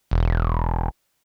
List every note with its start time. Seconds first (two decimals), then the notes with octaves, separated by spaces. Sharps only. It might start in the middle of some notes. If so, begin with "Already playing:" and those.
0.11 E1